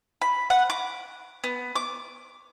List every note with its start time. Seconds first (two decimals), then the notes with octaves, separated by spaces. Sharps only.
0.22 B5
0.50 F#5
0.70 D6
1.44 B3
1.76 D6